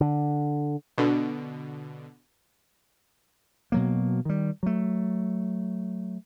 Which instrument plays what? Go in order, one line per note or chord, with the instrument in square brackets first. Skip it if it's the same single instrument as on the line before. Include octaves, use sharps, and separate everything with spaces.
[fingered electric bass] D3
[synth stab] B2 D3
[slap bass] B2 F#3 A#3
D#3 G3
F#3 A3